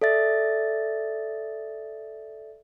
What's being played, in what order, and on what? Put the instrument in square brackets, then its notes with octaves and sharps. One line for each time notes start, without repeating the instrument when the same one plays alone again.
[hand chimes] A4 D5 E5 A6